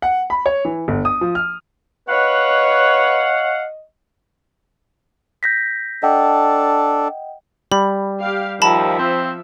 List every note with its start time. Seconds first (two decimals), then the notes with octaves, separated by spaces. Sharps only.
0.02 F#5
0.30 B5
0.46 C#5
0.65 E3
0.88 G1
1.05 D#6
1.21 F3
1.35 F6
2.09 B4 C#5 D#5 F5 F#5
5.43 G6 A#6 B6
6.03 D4 A4 D#5 F#5 G5
7.72 G3 B5
8.22 G4 F5
8.62 D#2 F3 E5 A5 B5
8.99 C4